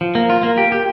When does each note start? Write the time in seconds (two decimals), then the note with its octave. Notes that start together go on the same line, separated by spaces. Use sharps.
0.01 F3
0.15 A#3
0.30 F4
0.43 A#3
0.58 G4
0.72 G4